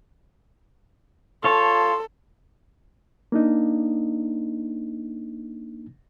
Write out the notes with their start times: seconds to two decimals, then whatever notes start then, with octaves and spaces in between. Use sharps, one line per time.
1.44 F4 A4 C#5 A5 C6
3.32 A#3 D4 D#4